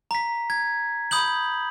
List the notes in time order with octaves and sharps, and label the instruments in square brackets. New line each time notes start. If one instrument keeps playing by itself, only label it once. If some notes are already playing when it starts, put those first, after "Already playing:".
[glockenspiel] A#5 B6
G#6
B5 D#6 G6 F#7